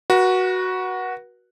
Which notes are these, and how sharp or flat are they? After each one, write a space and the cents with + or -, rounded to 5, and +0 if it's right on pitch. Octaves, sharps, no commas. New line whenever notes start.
F#4 +0 B4 -40